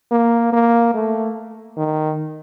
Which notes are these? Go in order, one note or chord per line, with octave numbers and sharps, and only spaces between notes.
A#3
A#3
A3
D#3